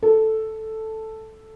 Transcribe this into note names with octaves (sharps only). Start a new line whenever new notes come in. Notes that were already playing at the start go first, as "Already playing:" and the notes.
A4